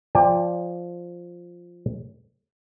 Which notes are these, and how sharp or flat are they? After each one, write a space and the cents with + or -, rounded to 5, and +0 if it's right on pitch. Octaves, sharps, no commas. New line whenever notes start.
F3 +0 D5 +0 G5 +30